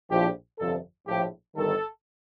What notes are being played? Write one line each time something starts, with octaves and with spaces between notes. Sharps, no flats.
A#1 A2 F3 G4
G1 F2 C3 F3 A4
A#1 A2 F3 G4
G1 G2 D#3 A4